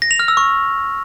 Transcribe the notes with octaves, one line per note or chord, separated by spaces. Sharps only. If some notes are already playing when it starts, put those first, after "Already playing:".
A#6
F7
F6
E6
C#6